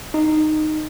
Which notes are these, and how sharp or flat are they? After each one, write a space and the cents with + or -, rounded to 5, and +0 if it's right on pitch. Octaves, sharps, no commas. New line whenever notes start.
D#4 -15